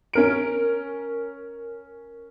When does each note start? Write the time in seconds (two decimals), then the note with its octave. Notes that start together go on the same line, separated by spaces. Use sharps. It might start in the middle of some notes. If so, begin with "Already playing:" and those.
0.13 C#4 A#4 D7